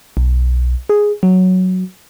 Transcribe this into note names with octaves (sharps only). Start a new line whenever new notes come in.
B1
G#4
F#3